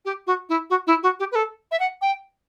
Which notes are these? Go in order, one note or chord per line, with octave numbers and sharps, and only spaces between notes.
G4
F#4
E4
F#4
E4
F#4
G4
B4
A4
E5
F#5
G5